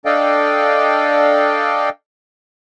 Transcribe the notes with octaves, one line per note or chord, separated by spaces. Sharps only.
D4 A4 D5 D#5 F5 G5